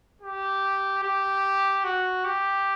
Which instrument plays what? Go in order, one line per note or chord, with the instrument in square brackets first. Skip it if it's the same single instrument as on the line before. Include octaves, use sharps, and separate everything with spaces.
[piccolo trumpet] G4
G4
F#4
G4